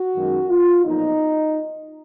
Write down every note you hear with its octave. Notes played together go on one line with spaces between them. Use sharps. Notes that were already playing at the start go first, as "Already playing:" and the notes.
Already playing: F#4
F#2 D#3 G#3
F4
B1 A#2 F3 D#4